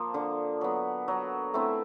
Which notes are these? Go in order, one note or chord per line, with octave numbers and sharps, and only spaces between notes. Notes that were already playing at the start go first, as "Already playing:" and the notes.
Already playing: F3 A#3
D3
F#3 B3
F#3
A3 C4 E4